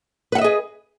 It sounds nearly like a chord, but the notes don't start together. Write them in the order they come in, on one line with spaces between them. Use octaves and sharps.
B4 F#5 E5 D#5 G#4